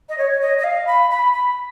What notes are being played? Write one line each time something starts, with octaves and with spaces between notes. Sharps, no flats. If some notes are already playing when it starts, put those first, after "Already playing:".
D#5
C#5
D#5
D#5
F5
B5
B5
B5